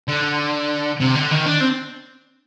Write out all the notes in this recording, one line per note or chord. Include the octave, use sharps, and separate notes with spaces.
D3
C3
D3
D#3
D4
C4